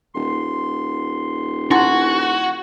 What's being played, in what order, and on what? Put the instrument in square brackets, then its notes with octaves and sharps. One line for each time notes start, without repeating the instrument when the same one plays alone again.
[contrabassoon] D#1 [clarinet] C6
[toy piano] E4 F#5 C6 [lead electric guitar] F#4 [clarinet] G#5